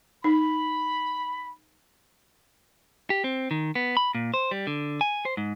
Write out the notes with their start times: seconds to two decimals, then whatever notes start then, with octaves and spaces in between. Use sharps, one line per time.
0.24 D#4 B5
3.10 G4
3.24 C4
3.51 D#3
3.75 B3
3.97 B5
4.15 A#2
4.34 C5
4.51 G3
4.67 D3
5.01 G#5
5.25 C5
5.37 G#2